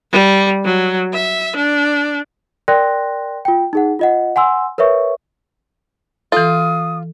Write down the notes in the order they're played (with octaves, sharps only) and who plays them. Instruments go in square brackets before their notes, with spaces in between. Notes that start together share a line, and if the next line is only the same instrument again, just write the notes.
[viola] G3
F#3
E5
D4
[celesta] A#4 D5 G5 C6 F#6 A#6
F4 G5
D#4 G#4 F#5
F4 D#5 F#5
F#5 G#5 C6 E6
A#4 B4 C#5 E5 C#6
[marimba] E3 A4 [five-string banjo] F4 [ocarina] D#6